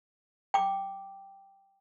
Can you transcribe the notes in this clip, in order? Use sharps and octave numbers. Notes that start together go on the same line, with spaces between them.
G5 D6